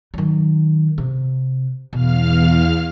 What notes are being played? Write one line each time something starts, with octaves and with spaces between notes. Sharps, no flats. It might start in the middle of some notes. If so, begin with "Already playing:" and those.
D#3 F#3
C3
E2 B2 F5 F6